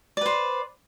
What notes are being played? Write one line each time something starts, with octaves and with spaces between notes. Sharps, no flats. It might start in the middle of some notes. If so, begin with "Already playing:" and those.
B4 C5 D5